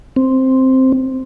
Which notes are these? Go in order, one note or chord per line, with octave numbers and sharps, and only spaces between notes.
C4